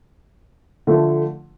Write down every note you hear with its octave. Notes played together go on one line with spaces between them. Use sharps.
D3 F3 A3